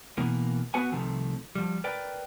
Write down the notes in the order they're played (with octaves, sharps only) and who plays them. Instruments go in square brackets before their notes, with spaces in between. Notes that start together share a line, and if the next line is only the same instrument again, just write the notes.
[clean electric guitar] B2 E3 A#3
B3 F#4 B4 F#5 G#5
C2 C3 D#3 F3 A3
F3 G3
A#4 B4 D5 G5